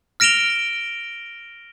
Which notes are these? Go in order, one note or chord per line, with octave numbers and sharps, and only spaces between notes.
F6 A#6 D7 E7 F7 G7